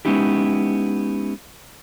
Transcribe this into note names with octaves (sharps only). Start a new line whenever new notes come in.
G#3 B3 C#4 D#4 E4 G4